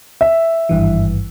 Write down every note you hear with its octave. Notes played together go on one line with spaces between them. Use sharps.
E5
G#1 G2 E3